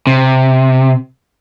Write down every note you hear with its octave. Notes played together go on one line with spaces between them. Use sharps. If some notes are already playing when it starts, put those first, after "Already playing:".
C3